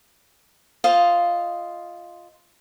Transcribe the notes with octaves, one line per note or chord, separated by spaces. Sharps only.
F4 C5 D#5 F5